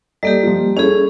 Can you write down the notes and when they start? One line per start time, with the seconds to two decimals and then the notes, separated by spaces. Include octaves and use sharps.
0.23 G3 A#3 G4 A4 D5 D#5
0.43 F3 F4
0.77 C#4 E4 G#4 A4 C#5